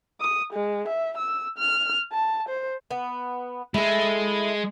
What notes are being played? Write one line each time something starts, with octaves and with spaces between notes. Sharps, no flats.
D#6
G#3
E5
E6
F6
A5
C5
B3
G#3 E4 A4